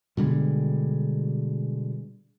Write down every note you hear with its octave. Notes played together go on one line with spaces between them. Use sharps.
B2 D3 G3 G#3